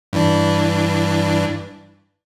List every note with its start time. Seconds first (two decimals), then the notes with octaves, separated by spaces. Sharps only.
0.13 G2 E3 D4